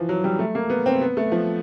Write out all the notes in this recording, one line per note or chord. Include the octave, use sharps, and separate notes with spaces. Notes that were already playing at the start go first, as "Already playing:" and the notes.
Already playing: E3 F3
F#3
G3
A3
A#3
B3
C4
B3
A3
F3